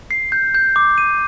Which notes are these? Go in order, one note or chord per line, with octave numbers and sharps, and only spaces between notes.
C7
G6
G6
D6
D#7